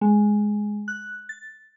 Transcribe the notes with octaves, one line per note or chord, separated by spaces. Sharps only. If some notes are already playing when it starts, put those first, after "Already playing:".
G#3
F#6
A6